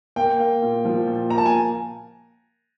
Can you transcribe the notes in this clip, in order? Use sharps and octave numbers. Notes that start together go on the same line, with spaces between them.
A#3 G5
A#3
A#2
F3
A#2
A#3 A#5
A5
G#5